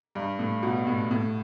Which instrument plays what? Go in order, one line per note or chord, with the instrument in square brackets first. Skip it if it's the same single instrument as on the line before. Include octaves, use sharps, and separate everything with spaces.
[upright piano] G2
A2
B2
A2
A2